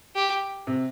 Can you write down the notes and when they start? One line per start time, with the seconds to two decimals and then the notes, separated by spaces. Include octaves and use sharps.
0.15 G4
0.67 C3